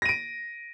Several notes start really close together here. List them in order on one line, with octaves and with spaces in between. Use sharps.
A#6 D#7 D7